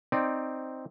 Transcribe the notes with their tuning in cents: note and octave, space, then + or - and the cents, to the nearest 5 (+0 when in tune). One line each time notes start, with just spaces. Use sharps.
C4 +0 D#4 +0 D5 +0